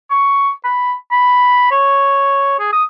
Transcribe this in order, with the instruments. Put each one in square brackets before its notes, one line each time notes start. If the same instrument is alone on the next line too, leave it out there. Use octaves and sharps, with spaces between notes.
[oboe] C#6
B5
B5
C#5
G#4
D#6